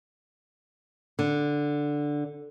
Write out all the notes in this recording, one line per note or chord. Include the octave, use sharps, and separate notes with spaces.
D3